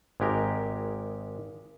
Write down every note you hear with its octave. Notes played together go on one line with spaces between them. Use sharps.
G#1 G#3 G4 A#4